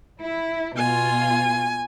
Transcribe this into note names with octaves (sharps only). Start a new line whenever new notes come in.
E4
B2 F4 G#5